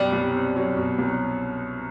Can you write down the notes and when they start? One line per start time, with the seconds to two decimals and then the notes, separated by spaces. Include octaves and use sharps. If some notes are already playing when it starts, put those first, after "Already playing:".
Already playing: F#2 B2 G3
0.13 C2
0.35 C4
0.57 F#3
0.77 B2
0.99 C2